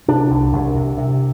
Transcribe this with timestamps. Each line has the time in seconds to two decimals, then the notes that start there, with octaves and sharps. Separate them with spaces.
0.08 C3 D4
0.31 C2
0.53 C2
0.75 C3
0.98 C3